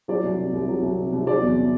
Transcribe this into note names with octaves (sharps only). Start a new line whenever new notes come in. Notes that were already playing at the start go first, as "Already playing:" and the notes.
F#3 D5
C2
C3
C2
F#3
C2
C3
C2
F#3 D5
E2
C3